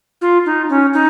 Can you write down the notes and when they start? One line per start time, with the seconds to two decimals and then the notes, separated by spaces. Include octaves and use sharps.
0.21 F4
0.46 D#4
0.69 C#4
0.93 D#4